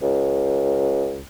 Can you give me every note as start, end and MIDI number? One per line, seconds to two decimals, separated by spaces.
0.02 1.22 37